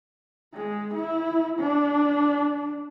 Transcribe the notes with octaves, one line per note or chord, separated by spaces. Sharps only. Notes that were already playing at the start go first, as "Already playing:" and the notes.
G#3
E4
D4